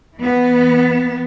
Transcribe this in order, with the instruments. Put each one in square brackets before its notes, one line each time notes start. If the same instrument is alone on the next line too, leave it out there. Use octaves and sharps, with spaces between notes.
[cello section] E3 B3